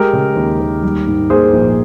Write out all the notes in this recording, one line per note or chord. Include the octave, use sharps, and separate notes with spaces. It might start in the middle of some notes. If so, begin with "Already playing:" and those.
Already playing: G#3 G4 A#4
C#3
D#2
D#2
G3
G#2
A#3 G#4 C5
A#1